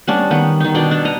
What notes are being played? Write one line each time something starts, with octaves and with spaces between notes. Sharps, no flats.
G3 B3 C#4 D4
D#3 B3
D#3 D#4
B2 D4 D5 G5
D4
D#5 A#5